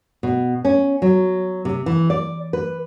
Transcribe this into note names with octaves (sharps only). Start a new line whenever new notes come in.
B2
C#4
F#3
C3
E3
D5
B4